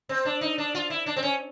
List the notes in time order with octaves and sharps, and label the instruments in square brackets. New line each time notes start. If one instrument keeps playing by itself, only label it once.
[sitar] C4
D4
D#4
D4
F4
E4
D4
C4
C#4